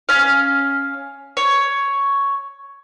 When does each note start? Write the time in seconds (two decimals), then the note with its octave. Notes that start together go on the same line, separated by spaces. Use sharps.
0.09 C#4 F5
1.37 C#5